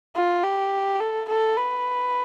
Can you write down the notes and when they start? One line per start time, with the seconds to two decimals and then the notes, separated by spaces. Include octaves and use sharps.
0.15 F4
0.43 G4
1.00 A4
1.28 A4
1.56 B4